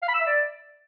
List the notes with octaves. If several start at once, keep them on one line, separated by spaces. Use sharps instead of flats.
F5
B5
E6
E5
D5